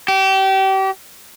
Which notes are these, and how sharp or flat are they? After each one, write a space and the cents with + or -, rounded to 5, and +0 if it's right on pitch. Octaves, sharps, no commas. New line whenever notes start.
G4 -30